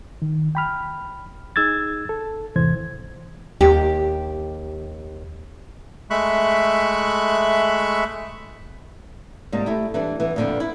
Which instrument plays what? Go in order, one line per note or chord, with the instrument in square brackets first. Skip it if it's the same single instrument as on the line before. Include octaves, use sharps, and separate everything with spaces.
[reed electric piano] D#3
G5 B5 F6
D#4 G#4 E6 G#6 A6
A4
E2 G#2 C3 E3 C5 G#6
[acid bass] D#2 [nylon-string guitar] G4
[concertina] G#3 A3 E5 B5 C#6 F#6
[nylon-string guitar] G#2 C3 G3 A#3
A3 E4 G4
E3 G3 D4
E3 B3
F2 A#2 D3 D#3 F3 B3
E4